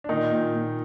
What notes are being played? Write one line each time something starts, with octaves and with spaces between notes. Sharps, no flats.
D4
A#2 D#3 D#4
A#2
A#2